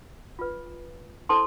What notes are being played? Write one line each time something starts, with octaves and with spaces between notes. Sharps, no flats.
F4 B4
E4 A4 C5 A5 C6